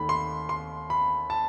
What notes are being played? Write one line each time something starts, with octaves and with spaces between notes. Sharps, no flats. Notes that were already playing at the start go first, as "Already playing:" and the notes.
Already playing: D#2 D#3 A3 B5
C6
C6
B5
A5